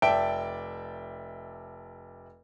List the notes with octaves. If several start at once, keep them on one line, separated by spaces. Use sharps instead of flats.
F1 D5 E5 G5 A5 D7